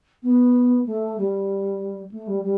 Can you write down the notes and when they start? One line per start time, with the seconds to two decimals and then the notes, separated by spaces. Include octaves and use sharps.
0.23 B3
0.86 A3
1.18 G3
2.11 A3
2.27 G3
2.42 G3